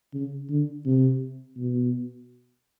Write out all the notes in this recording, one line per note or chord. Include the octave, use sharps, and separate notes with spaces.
C#3
D3
C3
B2